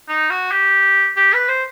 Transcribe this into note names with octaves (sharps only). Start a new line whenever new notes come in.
D#4
F#4
G4
G4
B4
C5